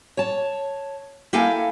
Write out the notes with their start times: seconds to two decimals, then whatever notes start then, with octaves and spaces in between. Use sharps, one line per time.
0.17 C#5 A5
1.33 A#3 E4 A4 F5 G5 G#5